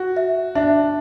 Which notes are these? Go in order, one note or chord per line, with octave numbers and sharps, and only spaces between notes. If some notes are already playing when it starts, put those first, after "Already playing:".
Already playing: F#4
E5
D4 E5